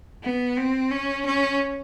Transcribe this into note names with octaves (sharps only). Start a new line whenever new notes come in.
B3
C4
C#4
C#4